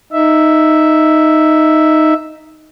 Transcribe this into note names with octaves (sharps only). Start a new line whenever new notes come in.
D#4 E5